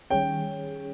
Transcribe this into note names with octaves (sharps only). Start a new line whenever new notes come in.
D#3 G3 C#4 G#4 C#5 G5